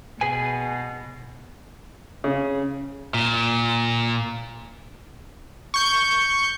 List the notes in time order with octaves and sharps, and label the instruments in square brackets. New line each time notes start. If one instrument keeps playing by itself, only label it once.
[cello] B2 [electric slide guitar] G#4 B4 G#5
[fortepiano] C#3
[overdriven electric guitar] A#2
[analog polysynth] C#6 G6